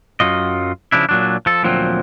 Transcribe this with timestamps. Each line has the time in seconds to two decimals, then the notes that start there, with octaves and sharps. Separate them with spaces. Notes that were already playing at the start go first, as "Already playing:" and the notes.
0.20 F#2 F#3 F4 D#5
0.92 C#3 F3 D4 E4
1.09 A#2 F#3 D4
1.46 F3 A4
1.63 D2 A#2 F3 F#3 C4